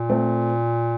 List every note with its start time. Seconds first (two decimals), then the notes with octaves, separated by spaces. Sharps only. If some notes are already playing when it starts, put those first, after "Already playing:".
Already playing: A#2
0.09 A3 C4